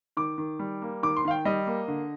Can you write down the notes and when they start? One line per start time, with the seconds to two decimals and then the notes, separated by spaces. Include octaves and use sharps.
0.17 D#3 D6
0.38 D#3
0.59 G3
0.82 A#3
1.03 D#3 D6
1.17 C6
1.25 D#3 F5
1.31 G5
1.45 G3 D#5
1.67 A#3
1.88 D3